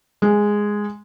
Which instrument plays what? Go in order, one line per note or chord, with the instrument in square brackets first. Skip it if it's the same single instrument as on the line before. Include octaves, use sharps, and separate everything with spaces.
[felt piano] G#3